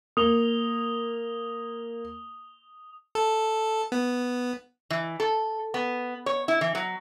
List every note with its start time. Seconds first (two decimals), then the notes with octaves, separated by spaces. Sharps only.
0.17 A#3 D#6 F7 G7
3.15 A4
3.92 B3
4.90 E3
5.20 A4
5.74 B3
6.26 C#5
6.48 E4
6.61 E3
6.75 F#3